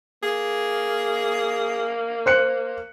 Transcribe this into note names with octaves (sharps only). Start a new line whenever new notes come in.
A#3 G#4
C5 F#6 C#7